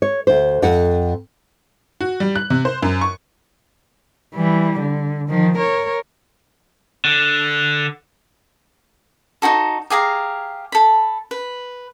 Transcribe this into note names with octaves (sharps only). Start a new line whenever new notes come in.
C#5
D2 C5
F2 F#5
F#4
G3
F#6
C3
C5
F#2
C#6
E3 G3
D3
D#3 F3
A#4 C#5
D3
D#4 E4 F#4 A4
G4 G#4 F5 A#5
A4 B5
B4